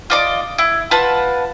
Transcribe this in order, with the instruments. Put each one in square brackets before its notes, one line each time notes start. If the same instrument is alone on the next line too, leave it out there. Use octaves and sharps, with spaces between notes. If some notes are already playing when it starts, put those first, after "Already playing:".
[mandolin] F4 D5 D#5
E4
F4 B4 F#5 A5